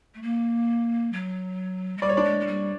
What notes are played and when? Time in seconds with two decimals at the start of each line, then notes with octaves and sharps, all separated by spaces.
0.15 A3
0.22 A#3
1.13 F#3
1.98 G#3
2.02 G3 D5
2.09 C#5
2.17 D4 D5
2.24 G#3
2.40 G#3
2.47 G3